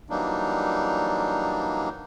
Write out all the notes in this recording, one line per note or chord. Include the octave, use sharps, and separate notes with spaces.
E3 F#3 G3 A#3 D4 D#4